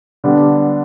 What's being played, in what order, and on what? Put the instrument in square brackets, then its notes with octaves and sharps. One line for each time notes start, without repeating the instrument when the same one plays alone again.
[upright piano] D3 G3 B3 D4